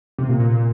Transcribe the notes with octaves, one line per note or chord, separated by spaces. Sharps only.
C3
A#2
A#2
A#2